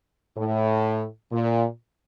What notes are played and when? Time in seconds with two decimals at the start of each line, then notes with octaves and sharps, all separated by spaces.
0.36 A2
1.31 A#2